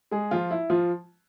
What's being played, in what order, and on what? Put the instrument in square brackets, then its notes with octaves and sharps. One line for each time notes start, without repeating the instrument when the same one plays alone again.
[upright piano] G#3 G#4
F3 F4
E4
F3 F4